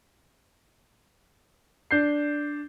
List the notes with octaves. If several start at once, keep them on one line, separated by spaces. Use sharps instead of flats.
D4 G6 C7